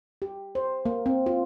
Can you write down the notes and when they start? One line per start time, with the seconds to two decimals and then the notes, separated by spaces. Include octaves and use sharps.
0.22 G4
0.55 C5
0.85 A#3
1.06 C4
1.26 F4